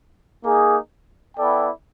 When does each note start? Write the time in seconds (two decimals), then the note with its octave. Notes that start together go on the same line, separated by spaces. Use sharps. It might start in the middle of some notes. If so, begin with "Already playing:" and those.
0.44 A#3 D#4 G#4
1.37 B3 E4 A4 D5 G5